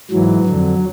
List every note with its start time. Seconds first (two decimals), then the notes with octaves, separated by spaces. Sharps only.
0.11 G#2 E3 F#3
0.46 F2 D3